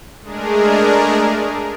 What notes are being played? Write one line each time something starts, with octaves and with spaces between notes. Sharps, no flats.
G#3 A3 D4 G#4 A#4